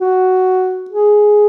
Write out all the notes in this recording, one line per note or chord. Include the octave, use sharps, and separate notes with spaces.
F#4
G#4